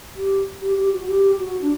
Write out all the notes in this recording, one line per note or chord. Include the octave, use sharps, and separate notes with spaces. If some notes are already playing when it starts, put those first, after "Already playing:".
G4
G4
G4
F#4
G4
F#4
D4